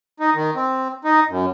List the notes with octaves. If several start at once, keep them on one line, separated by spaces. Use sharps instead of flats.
D#4
D#3
C4
D#4
F#2